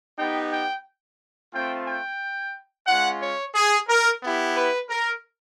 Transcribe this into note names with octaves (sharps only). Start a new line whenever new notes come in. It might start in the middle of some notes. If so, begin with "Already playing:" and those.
B3 D#4 G4 G5
G5
A3 C4 F4 G5
G5
G#3 C#4 F4 F#5
C#5
G#4
A#4
B3 E4 G4
B4
A#4